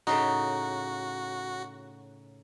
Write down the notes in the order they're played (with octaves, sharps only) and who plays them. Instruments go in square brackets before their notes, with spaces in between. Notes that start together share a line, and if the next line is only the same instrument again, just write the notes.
[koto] A2 C#3 D#4 [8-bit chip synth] F#4